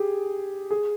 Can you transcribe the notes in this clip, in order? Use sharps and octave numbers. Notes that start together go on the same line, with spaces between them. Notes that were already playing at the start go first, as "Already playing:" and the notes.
Already playing: G4 G#4
G#4